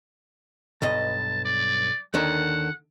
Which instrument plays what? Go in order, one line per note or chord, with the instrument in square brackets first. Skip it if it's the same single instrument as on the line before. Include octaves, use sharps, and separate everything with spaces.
[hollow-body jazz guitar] B1 G2 D#5 [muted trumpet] A5
[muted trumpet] D5
[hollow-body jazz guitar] D#2 D3 D#3 [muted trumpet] F#5